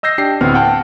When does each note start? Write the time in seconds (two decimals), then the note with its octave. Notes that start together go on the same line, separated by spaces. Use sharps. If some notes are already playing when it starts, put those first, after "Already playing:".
0.03 D#5 E6 G6 A#6 C7
0.18 D4 G4 C7
0.41 D2 A2 B3 C4 F6
0.54 F#5 G5 A5